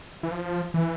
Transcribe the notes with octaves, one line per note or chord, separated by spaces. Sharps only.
E3
F3
E3